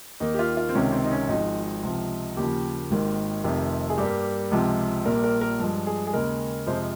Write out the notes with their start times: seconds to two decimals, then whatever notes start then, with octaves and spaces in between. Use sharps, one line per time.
0.20 D#2 D#3 A#3 D#4
0.34 G4
0.39 F4
0.57 F4
0.69 C4
0.74 C#2 C3 D#3 C#4
0.92 C4
1.04 D#4
1.11 C#4
1.28 G#1 G#2 F3 G#3 D#4
1.83 C#2 C3 F3
2.37 D#2 C#3 F3 G4
2.91 G#1 G#2 D#3 A#3
3.44 F1 F2 C3 D#3
3.90 G#4
3.98 G2 G3 A#3 G4
4.51 C#2 C3 F3 G#3
5.05 A#1 A#2 G3 A#3 A#4
5.24 A#4
5.41 A#4
5.59 G2 F3 G#3
5.87 G#4
6.07 G#4
6.13 D#2 C#3 G#3 A#4
6.66 F2 C3 F3 G#3 C5